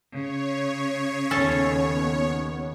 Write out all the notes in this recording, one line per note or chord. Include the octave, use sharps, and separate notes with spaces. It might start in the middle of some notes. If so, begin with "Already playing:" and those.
C#3 C#5
D#2 B3 C#4 A4